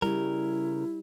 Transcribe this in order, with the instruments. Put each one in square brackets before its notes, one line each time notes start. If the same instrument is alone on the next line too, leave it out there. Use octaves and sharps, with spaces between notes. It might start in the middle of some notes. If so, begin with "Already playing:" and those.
[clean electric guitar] C#3 A#4 [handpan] G3 [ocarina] E4